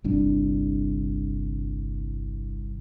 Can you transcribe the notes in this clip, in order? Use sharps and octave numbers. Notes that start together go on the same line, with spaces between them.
G1 C2 D4